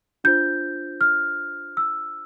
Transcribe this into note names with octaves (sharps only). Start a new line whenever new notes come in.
D4 F4 C5 G6
F6
E6